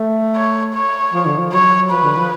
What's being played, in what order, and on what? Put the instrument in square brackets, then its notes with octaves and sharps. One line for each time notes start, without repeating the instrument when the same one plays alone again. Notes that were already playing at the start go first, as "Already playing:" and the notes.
Already playing: [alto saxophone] A3
[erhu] C#5
C#5
[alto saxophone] F3
D3
F3
[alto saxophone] F#3 [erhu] C#5
[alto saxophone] F3 [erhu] B4
[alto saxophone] D3
F3